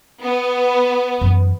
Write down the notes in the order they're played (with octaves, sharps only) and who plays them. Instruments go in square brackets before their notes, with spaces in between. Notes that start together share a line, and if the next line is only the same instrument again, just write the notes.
[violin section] B3
[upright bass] F#2 E3